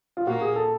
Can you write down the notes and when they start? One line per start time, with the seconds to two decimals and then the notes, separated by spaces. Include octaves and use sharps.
0.17 F4
0.26 A#2 A#3 F#4
0.41 G#4
0.56 A4